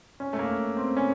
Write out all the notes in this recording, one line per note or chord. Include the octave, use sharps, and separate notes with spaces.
C#4
A3
A#3
C4
C#4